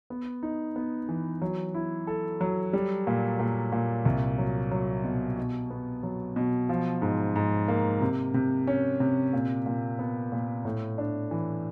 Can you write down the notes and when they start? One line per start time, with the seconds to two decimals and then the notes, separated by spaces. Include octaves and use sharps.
0.10 B3
0.43 D#4
0.76 B3
1.09 E3
1.42 F#3
1.74 E4
2.07 A4
2.41 F#3
2.73 G3
3.07 A#2
3.40 A#2
3.72 A#2
4.05 C2
4.38 F#3
4.71 F#3
5.04 B2
5.38 B2
5.70 B3
6.03 F#3
6.36 B2
6.69 F3
7.02 G#2
7.36 G#2
7.68 A#3
8.01 C3
8.34 C3
8.67 C#4
9.00 C3
9.33 A#2
9.66 A#2
9.99 B3
10.32 A#2
10.65 A2
10.98 D4
11.31 E3